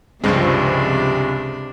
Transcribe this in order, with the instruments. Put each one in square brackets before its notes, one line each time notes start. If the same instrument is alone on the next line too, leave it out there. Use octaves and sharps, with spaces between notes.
[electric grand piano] C#2 G2 G#3 [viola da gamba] C3 D4 [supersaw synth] F3 C4